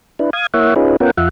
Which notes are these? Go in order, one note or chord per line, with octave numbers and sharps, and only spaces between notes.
D4 E4 B4
F5 D#6 G#6
A#3 E4 C#5 E5 F#5
C#4 D#4 F4 G#4 B4
B3 C#4 F4 A#4 F#5 G5
F2 F4 E5 F#5